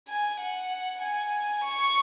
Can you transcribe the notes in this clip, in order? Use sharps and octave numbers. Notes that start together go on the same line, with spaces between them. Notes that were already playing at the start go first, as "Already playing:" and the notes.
G#5
F#5
G#5
C#6